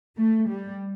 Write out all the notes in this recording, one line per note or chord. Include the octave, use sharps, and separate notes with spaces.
A3
G3